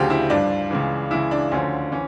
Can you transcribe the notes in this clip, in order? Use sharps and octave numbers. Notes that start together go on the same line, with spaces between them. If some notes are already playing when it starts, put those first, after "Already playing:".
Already playing: D2 C#3 F3 G4
E4
G2 F3 D4
C#2 C#3 E3
C#2 C#3 E3 E4
D4
D2 D3 F3 C#4
E3 C#4